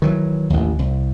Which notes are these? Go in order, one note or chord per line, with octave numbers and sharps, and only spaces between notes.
D#3 E3 F#3
A1 D#2
C2